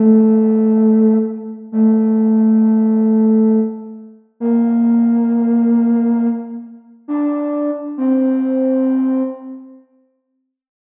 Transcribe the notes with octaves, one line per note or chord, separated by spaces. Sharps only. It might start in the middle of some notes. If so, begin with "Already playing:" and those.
Already playing: A3
A3
A#3
D4
C4